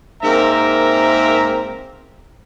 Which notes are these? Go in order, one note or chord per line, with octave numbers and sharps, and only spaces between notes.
G#2 A#3 C4 A#4 E5 A#5